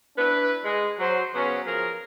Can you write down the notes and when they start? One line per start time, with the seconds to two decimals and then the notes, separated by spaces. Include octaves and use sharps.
0.17 D4 E4 B4
0.64 G#3
0.99 F#3 C5
1.34 C#3 F#3 B3 C#4
1.66 F3 G#4 A#4